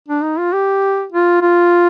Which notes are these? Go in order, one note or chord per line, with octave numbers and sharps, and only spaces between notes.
D4
D#4
F4
G4
F4
F4